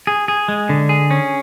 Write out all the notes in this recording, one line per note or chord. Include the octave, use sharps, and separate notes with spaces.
G#4
G#4
G#3
D3
G#4
C#4